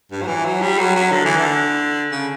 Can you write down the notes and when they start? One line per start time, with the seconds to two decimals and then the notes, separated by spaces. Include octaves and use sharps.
0.12 G2
0.22 F#3
0.28 E3
0.45 F#3
0.62 G3
0.79 F#3
0.96 F#3
1.12 D3
1.25 E3
1.37 D3
2.12 C#3